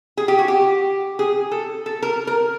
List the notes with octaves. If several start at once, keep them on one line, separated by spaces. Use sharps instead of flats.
G#4
G4
F#4
G4
G#4
A4
A4
A#4
A#4